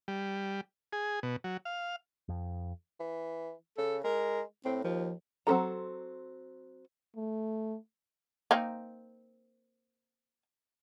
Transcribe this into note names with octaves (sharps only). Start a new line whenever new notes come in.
G3
G#4
B2
F#3
F5
F2
E3
C#3 A4
G#3 A#4
A2 C4
D#2 F3
F#3 C4 C#4 A4 A#5
A3
A#3 C4 D#4